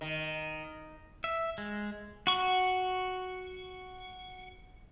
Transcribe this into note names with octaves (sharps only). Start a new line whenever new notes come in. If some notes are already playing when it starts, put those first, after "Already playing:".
D#3
E5
G#3
F#4 C#6